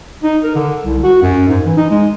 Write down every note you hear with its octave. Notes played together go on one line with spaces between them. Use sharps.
D#4
A#4
D3
C2
F#4
F#2
G#2
E3
D#4
G#3